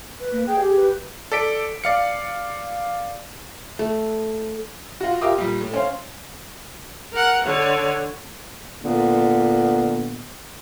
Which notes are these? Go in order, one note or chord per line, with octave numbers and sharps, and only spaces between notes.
B4
A#3
G#4 G5
G4
B4
A4 D5 B6 D7
D5 F5 C#7
A3
F4 F#4
F4 G4 A#4 E5 D6 D#6
A#2 G3
A2
C#4 C5 F5
A#4 F#5
D3 C#5
A#2 D3 B3